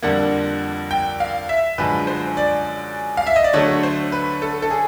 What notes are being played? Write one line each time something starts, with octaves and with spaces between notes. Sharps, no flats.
F2 D3 G3 A#3 D4 F#5
G5
F5
E5
F#2 D3 F3 G#3 B4
C5
D5
F5
E5
D#5
D5
D3 F#3 A3 C#5
C5
B4
A4
A4
G#4